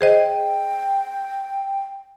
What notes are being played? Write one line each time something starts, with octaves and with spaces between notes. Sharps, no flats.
G#4 C5 D#5 G5